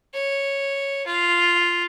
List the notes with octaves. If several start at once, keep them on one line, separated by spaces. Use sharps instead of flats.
C#5
F4